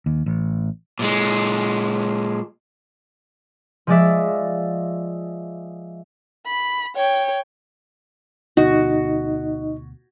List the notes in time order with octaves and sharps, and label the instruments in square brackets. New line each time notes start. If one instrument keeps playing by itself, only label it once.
[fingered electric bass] D#2
A1
[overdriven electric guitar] A#2 G#3
[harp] F3 G#3 D5 E5
[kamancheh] B5
C#5 G5
[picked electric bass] D2 B2 [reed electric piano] D#4 D#5 [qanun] F#4